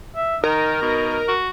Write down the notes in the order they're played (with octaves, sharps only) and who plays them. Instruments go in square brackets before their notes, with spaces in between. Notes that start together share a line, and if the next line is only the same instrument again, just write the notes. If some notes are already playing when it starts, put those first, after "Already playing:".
[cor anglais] E5
[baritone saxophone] D#3 [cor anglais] D#4 [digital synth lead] A#4
[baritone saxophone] B2 [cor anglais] D#4
[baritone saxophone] F#4